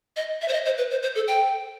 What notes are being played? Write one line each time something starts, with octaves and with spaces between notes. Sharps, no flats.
D#5
E5
C5
D#5
C5
B4
C5
C5
A4
G5